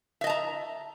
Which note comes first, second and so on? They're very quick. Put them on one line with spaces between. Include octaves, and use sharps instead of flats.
E5 D#5 A5 A#5